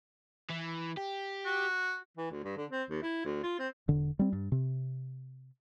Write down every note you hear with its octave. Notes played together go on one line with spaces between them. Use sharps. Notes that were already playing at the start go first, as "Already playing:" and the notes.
E3
G4
F#4
E3
D2
G2
D3
C4
D#2
E4
D2
F4
C4
E1 D3
G3 C4
G2
C3